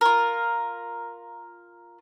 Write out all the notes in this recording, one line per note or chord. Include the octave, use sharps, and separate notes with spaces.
F4 A#4